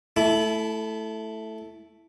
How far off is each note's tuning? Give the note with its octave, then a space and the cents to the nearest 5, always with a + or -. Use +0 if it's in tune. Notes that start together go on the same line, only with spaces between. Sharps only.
A3 +0 E4 +0 A5 -45